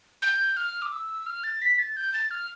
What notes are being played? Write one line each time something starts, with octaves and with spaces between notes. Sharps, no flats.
G6
F6
D6
E6
F6
A6
B6
A6
G6
A6
F6